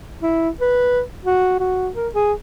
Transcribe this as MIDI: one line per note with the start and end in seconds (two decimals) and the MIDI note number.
0.22 0.49 64
0.61 1.01 71
1.25 1.57 66
1.60 1.89 66
1.95 2.08 70
2.14 2.33 68